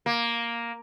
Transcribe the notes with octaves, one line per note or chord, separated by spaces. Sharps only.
A#3